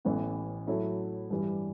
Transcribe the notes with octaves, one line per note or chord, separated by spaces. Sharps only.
A1 A2 E3 B3
A2 F#3 A3 E4
G2 E3 G3